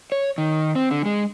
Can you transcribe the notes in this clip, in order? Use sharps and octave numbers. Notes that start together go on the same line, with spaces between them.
C#5
D#3
C4
D3
G#3